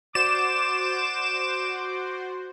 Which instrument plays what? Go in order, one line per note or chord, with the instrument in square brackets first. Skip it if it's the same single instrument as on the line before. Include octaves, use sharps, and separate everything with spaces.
[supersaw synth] F#4 C5 [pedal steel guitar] D5 [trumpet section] D6 [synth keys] E7